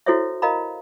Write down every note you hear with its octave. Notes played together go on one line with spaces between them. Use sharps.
E4 F#4 A4 C5 C#5 E5
A#4 D#5 F5 A#5 B5